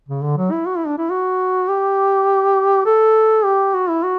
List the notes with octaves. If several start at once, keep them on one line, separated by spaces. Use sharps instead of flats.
C#3
D3
F#3
E4
F#4
E4
D4
E4
F#4
G4
A4
G4
F#4
E4
F#4